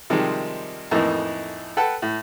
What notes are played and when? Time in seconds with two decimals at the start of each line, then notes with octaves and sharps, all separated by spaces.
0.10 C3 D#3 F3 G3 G#3
0.91 F2 A2 E3 A#3 D#4
1.77 A4 B4 F#5 G5 A5
2.02 A2